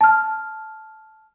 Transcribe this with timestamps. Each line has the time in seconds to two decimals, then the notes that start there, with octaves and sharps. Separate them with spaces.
0.01 A5 F6